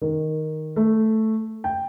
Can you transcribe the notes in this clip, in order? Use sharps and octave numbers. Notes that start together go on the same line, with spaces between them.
D#3
A3
G5